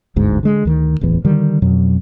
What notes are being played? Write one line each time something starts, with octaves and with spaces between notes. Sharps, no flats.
G1 D2 G#2
D3 G#3
D2 D#3
D1 A1 E2 E3
D3 D#3 G3
F2 B2 F#3